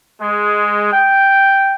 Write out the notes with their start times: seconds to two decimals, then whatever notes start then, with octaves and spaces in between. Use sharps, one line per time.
0.21 G#3
0.93 G5